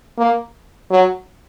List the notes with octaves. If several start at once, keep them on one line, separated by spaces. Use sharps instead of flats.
A#3
F#3